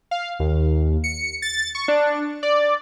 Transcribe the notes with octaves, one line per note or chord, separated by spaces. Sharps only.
F5
D#2
C#7
A6
C#6
D4
D5